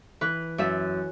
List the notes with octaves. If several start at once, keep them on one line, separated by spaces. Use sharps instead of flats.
E3 B4
F#2 E5